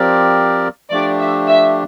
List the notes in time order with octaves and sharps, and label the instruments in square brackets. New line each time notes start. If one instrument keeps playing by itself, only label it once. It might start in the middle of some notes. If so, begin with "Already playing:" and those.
Already playing: [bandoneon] F3 C4 G4 A#4 D5
[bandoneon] F3 A3 D4 G4 [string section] D5
[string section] E5
E5